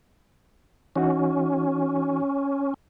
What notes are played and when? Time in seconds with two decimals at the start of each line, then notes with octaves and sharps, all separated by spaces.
0.96 E3 C#4 D#4 F#4